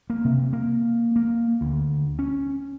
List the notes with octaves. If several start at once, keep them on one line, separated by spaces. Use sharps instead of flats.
A#3
C3
A#3
A#3
D2
C#4